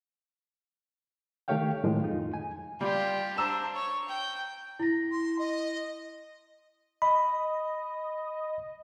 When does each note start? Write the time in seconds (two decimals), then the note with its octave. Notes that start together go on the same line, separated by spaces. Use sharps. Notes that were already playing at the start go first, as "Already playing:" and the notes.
1.48 D#3 A3 G4 C#5 F5 G5
1.84 A2 D#3 F3 G#3
2.03 F2 D#4 F4
2.34 G#5
2.81 G3 F4 G4
3.37 D4 C5 A#5 E6 E7
3.75 C#5
4.09 G5
4.79 E4 A#6
5.11 C6
5.39 D#5
7.02 D#5 B5